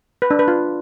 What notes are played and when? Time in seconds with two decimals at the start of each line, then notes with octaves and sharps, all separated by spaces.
0.22 B4
0.31 D4
0.39 B4
0.48 F4